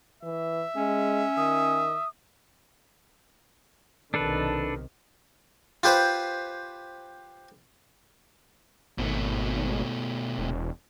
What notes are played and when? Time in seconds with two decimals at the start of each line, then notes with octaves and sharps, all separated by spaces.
0.23 E3 E5
0.76 G#3 C#4
1.37 D#3 D#6
4.14 B1 C3 D#3 D4 A4 B4
5.83 F4 G4 B4 C5
8.98 G#1 B2 A3
10.38 E1